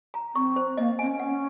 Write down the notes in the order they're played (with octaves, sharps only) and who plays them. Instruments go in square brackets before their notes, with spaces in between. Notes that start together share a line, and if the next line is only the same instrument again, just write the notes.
[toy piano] A#5
[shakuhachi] C4 [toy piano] C#6
[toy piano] C5
[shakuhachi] A#3 [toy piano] D#5
[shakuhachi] C4 [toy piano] G#5
[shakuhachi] C#4
[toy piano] F#5